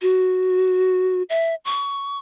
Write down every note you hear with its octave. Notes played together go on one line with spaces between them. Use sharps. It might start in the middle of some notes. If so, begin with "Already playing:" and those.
F#4
E5
C#6